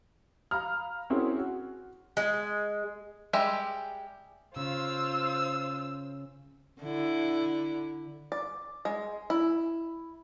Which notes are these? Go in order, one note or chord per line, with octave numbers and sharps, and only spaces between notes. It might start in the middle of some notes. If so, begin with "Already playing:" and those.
F5 A#5 B5 F6
C4 C#4 E4 F#4 G#4 A#4
F#4
G#3
G3 G#3 G4 E5
C#3 F4 C5 E6
D3 E4
D5
G#3
E4